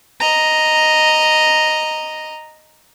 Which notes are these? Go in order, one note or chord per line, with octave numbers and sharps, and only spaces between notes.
D#5 A#5